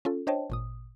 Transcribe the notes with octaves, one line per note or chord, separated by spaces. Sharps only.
C#4 F4 A4
D4 C5 C#5 D#5 G5 A5
G#1 A#2 D#6